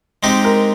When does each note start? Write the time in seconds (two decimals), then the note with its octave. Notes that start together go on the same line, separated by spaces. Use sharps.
0.23 G#3 C4 D#4 G4
0.45 A#4